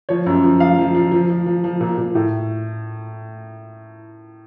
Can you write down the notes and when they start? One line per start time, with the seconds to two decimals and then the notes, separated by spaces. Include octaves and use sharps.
0.09 F3 C#5
0.26 F#2
0.44 F3
0.60 F3 F5
0.78 F3
0.95 F3
1.12 F3
1.30 F3
1.46 F3
1.64 F3
1.81 A#2
1.98 A#2
2.15 A2